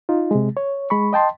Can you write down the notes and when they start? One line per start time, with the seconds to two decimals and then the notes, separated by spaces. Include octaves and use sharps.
0.09 D#4 F4
0.31 C3 G#3
0.57 C#5
0.90 G#3 B5 C#6
1.13 D#5 G5 A5 C6